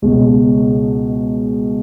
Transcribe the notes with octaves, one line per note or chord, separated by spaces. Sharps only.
C#2 B2 G#3